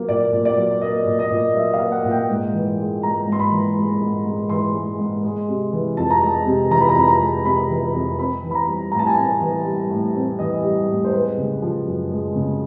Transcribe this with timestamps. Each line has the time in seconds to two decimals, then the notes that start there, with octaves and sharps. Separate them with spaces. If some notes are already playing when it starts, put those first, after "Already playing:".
Already playing: F#3 A#3
0.09 A#2 D5
0.32 A#2
0.45 D5
0.57 F#3
0.81 A#3 D#5
1.06 A#2
1.19 D#5
1.30 A#2
1.55 F#3 E5
1.74 F5
1.79 A#3
1.92 F#5
2.04 A#2
2.11 G5
2.30 G#2
2.53 E3
2.78 G#3
3.03 G#2 A#5
3.27 G#2 C6
3.39 B5
3.51 E3
3.76 G#3
4.01 G#2
4.25 G#2
4.49 E3 C6
4.75 G#3
4.99 G#2
5.24 G#3
5.48 C3
5.72 E3
5.97 F2 A5
6.10 A#5
6.22 G#3 A5
6.46 C3
6.70 E3 A#5
6.81 B5
6.89 A#5
6.95 F2 B5
7.08 A#5
7.20 G#3
7.45 C3 B5
7.70 E3
7.94 F2
8.18 C4 B5
8.43 E3
8.51 B5
8.55 A#5
8.68 G3
8.92 A2 A#5
8.99 A5
9.07 G#5
9.14 C4 A5
9.41 E3
9.65 G3
9.90 A2
10.15 C4
10.39 E3 D#5
10.63 G3
10.89 A2
11.04 C5
11.13 G#3 B4
11.38 C#3
11.62 F3
11.87 F#2
12.11 G#3
12.35 C#3